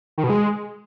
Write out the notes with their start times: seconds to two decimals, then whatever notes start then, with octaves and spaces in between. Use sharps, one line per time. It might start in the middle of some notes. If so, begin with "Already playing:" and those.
0.18 D#3
0.24 B2
0.30 G#3